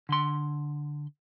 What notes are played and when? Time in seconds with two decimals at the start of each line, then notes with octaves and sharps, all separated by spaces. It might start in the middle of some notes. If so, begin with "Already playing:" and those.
0.09 D3 C6